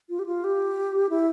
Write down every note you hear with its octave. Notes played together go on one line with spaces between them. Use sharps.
F4
G4
F4
G4
E4